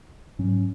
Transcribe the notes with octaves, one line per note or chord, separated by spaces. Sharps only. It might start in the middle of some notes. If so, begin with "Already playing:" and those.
G#2 F#3 C#4